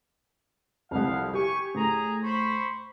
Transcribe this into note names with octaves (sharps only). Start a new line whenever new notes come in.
C2 F2 F5 F#5
G4 G#5 C#6
A2 G#4 A#5
C5 B5 C#6